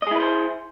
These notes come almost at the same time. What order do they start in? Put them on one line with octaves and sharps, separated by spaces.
D#5 G#4 E4 B4 C5